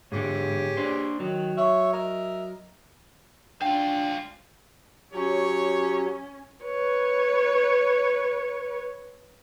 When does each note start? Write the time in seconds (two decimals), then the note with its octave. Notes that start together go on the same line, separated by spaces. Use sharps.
0.12 G#2 D3 G4 G#4 C#5
0.77 D4 C5
1.20 D#3 F#3
1.57 C#5 E5
1.93 A#4 D#5 E5
3.62 G#3 D4 F5 G5
5.13 F#3 C#4 G4 C#5
6.65 B4 C#5